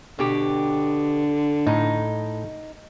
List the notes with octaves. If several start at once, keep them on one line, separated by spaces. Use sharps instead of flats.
B2 D3 G4
A2 D#4